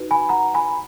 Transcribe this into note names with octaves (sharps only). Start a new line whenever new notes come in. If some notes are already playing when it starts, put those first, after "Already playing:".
Already playing: D#4 F#4 B4
G#5 B5
F#5 A#5
G#5 B5